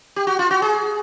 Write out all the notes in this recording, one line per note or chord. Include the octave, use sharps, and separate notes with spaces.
G4
F#4
F4
F#4
G#4